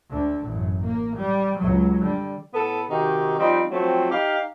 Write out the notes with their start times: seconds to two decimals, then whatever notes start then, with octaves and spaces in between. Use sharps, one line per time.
0.10 D2 D3
0.46 A1 F#2
0.84 A#3
1.16 G3
1.58 C#2 F#3
2.03 D3 G3
2.54 A2 B3 A4
2.89 C3 D#3 D#4 F#4 G4
3.39 F3 G3 C4 D#4
3.71 F3 F#3 A3 C4
4.11 D#4 G4 F5